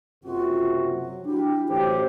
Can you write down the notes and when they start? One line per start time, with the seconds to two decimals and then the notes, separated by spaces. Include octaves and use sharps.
0.24 F#1 C3 F4 F#4
0.91 F#3
1.25 D4 E4 F#4 G4
1.69 A1 F#3 G4 C5